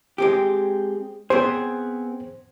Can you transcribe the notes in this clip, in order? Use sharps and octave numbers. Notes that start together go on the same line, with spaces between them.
G#3 C4 G4
B3 C4 G#4 C5